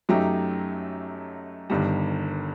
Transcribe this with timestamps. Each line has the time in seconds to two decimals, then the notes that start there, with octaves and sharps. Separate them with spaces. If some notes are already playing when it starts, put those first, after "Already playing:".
0.09 F#2 F#3 A3 D#4 G4
1.70 G1 G2 D#3 G3